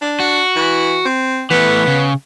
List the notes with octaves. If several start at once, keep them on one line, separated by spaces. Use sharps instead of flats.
D4
F#4
E3
C4
E3 A3 B3
C#3